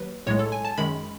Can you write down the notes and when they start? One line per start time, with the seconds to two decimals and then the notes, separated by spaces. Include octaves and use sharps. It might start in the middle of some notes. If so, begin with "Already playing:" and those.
Already playing: D#2 F#3 B4
0.27 B1 A2 G#3 C#5
0.39 A4
0.52 G#5
0.65 A5
0.78 F#2 D#3 G#3 B5